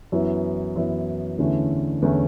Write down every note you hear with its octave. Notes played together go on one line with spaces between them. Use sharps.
F#2 E3 B3 E4
F#2 E3 B3 E4
E2 D3 A3 C#4 E4
E2 D3 A3 C#4 E4